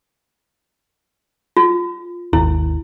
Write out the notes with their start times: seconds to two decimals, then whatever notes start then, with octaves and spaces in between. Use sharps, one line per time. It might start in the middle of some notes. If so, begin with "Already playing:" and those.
1.57 F4
2.33 G#1 D#2 E4